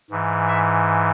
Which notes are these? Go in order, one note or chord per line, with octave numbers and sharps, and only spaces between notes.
G#2 E3
E5